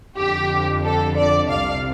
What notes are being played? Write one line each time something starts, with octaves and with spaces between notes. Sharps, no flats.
F2 D3 G4
A4
D5
C2 C3 F5